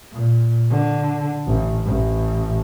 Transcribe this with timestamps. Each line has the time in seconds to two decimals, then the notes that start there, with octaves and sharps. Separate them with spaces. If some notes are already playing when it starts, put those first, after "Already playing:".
0.12 A#2
0.70 D3
1.47 A1
1.85 A1